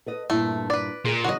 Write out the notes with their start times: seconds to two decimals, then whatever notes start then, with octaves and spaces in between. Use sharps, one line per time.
0.06 A4 B4 D#5
0.30 G2 A#2 A3 E4
0.70 B4 D5
1.05 A#2 G#4
1.24 C#3 E3 F#3 F#4 D#5